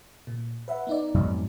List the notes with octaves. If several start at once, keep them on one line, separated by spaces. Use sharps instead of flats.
A#2
B4 E5 F#5
B3 D#4 D5
F2 G#2 F#3